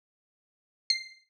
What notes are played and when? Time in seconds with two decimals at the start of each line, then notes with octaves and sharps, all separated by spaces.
0.90 C7